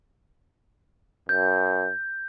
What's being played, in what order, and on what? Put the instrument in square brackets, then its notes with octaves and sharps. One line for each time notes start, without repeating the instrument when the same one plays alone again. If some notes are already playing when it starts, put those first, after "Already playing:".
[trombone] F#2 [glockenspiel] G6